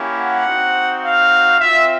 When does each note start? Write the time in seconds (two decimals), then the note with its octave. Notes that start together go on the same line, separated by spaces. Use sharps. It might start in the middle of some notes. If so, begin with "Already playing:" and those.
Already playing: A#3 C#4 E4 G4
0.17 F#5
0.45 C4 D#4 F#4
1.04 F5
1.60 C4 F4 E5